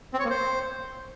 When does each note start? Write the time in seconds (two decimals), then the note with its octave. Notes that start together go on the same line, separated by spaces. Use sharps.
0.14 C4
0.19 C#5
0.25 A#3
0.30 C5